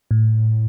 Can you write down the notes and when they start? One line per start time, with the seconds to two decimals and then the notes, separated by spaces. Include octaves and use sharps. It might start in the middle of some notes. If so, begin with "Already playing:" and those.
0.11 A2